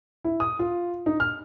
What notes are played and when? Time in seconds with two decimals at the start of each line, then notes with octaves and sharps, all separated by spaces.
0.24 E4
0.40 D#6
0.59 F4
1.06 D#4
1.20 F6